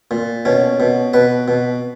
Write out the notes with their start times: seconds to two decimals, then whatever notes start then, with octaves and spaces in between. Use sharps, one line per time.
0.11 A#2
0.45 B2 C#4
0.80 B2
1.13 B2 B4
1.48 B2